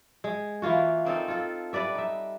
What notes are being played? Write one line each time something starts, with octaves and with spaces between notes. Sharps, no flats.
G#3
E3 A#3 F4 F#4
A#3 C4 D#4 A4
F4 A4
G3 B4 D5 E5
D#4 E5